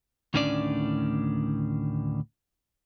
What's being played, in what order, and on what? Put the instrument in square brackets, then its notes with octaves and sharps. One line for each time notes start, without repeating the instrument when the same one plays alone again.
[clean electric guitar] D2 A2 D#3 C#4 D4 D5